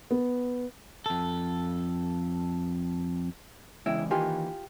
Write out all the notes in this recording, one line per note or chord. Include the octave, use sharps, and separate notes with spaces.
B3
F2 A4
E2 C#3 G#3 E4 G5
D#3 E3 A#3 F4 G4 G#5